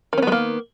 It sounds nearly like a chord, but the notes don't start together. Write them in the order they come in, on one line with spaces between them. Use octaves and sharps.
D#3 C#4 B3 G#3 A#3